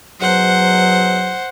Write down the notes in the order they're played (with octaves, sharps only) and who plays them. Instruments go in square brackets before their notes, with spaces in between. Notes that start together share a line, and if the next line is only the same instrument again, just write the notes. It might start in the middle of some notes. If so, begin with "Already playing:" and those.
[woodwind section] G#2 B2 F#3 [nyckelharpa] C5 F#5